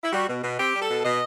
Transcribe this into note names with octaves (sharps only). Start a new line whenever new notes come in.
E4
G3 F#4
B2
B2
C4 G4
G3
A4
B2
B2 D#5